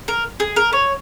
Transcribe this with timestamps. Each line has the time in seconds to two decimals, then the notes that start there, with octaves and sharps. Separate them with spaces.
0.08 A#4
0.40 G#4
0.56 A#4
0.73 C#5